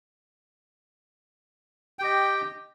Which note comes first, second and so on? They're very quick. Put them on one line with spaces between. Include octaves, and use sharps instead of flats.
G5 G4 D#5